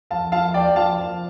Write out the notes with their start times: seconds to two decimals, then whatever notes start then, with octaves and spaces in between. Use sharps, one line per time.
0.11 F2 F5 A5
0.32 F3 F5 A5
0.54 F2 D5 G5
0.76 F3 F5 A5
0.97 F3